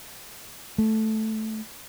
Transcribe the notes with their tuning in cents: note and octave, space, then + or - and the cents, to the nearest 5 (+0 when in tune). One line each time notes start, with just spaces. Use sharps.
A3 -5